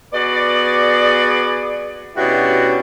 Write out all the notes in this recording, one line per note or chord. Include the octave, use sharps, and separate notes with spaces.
B3 F#4 G#4 D5
B2 G3 C#4 D4 E4 F#4